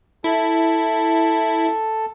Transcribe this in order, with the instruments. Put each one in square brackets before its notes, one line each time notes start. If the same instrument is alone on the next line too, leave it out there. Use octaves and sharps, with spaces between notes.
[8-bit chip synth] E4 [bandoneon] A4